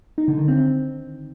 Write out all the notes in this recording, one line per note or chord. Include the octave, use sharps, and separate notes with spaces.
D#4
D3
D#3
C4